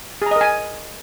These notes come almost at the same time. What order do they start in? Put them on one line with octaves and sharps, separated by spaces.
G#4 A#5 D#5 A#4 G#5